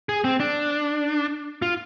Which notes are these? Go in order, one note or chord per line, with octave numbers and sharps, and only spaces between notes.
G#4
C4
D4
F4